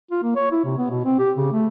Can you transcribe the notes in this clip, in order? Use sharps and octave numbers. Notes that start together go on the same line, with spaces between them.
F4
A#3
C#5
E4
C3
B3
B2
C4
G4
C#3
A3